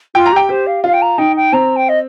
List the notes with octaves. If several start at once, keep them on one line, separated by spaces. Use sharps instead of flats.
F4 G5
A#5
G4 G5
G4 C5
F5
F4 F5
G5
A#5
D#4 G5
G5
C4 A#5
G5
D#5